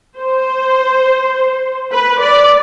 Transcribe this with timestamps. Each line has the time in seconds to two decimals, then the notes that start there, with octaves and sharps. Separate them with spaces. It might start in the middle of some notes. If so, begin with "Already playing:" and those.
0.17 C5
1.91 B4
2.20 D5